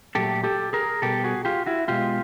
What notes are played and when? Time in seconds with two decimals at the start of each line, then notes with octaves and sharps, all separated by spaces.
0.15 A#2 F#3 A3 G4 A4
0.44 G4 A4
0.73 G#4 A#4
1.02 B2 G3 G4 A4
1.24 F#4 G#4
1.45 F4 G4
1.66 E4 F#4
1.88 B2 G#3 F4 G4